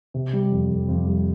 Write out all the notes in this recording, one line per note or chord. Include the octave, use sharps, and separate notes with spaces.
C3
G3
F2
F2
F2
G3